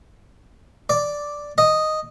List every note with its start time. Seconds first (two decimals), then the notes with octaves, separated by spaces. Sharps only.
0.89 D5
1.58 D#5